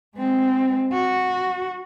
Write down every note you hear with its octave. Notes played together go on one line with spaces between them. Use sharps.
G#3 C4
F#4